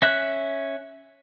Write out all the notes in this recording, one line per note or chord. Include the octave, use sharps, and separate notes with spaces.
C#4 E5 F#6